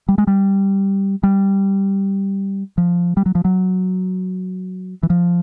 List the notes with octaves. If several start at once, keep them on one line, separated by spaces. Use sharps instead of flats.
G3
G#3
G3
G3
F3
G3
F#3
F3
F#3
E3
F3